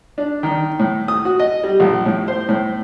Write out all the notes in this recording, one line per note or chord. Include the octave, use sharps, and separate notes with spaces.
D4
D#3
A2
D#6
F#4
D#5
G3
A#1
A2
C5
A2